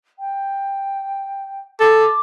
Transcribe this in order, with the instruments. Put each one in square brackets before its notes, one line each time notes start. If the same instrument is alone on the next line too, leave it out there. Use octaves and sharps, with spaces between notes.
[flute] G5
[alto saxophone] A4 [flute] D6